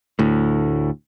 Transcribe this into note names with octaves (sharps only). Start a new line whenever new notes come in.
D2 A2